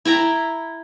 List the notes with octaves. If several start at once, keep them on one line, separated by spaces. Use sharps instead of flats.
E4 E5 G5 A#5